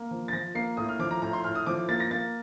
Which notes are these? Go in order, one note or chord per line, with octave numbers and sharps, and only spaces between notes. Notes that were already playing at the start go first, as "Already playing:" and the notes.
Already playing: A#3
F3
A6
F3 A#6
A#3 C7
A2 D#6
F6
F3 D6
A#5
A2 A#5
C6
A2 F6
D#6
F3 D6
A#3 A6
A#6
A#3 A6